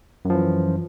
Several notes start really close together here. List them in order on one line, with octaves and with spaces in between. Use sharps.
F#2 F3 E3